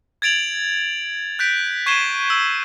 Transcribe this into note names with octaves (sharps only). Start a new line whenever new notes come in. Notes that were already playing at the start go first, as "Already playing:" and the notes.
G#6 A6 D7 F7 F#7
F#6 G6 B6 D7
C#6 G#6 C7 D#7 E7 G7
E6